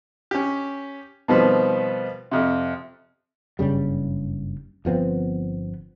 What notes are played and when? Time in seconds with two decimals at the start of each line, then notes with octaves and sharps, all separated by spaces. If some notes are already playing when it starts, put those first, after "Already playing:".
0.31 C#4 G4
1.28 B2 D#3 F3 G3 B3 C4
2.31 F2 C3
3.59 F#1 G2 C#3 G3
4.85 G1 F3 B3 C4